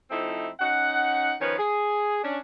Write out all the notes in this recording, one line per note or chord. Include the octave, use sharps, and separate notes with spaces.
F3 A3 C4 D#4 E4
C#4 D#4 F#5
D#3 F3 C#4 B4 C#5
G#4
C#4 D4